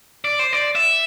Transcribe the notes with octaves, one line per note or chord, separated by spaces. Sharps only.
D5
C5
D5
E5